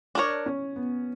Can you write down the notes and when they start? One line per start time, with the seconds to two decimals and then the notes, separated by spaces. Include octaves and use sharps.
0.15 D4 A#4 C#5
0.46 C#4
0.76 B3